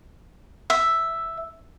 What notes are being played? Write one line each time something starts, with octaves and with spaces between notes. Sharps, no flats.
E5